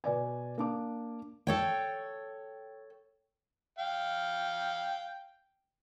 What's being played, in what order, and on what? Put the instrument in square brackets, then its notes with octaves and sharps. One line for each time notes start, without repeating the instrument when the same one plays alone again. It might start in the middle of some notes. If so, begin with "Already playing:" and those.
[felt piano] B2 B4 D5 G#5
A#3 D4 D6
[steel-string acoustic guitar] A4 C#5 G5
[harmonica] F5 G5